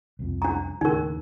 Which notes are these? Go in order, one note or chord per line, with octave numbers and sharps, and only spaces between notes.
C2 F2
D4 A#5
D#2 A2 C#3 D#4 A#4